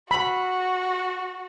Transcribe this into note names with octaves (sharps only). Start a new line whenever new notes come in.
F#4 B5